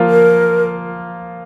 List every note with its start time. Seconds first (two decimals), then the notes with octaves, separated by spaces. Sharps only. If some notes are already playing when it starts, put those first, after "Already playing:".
Already playing: F3 A#3 F4
0.10 A#4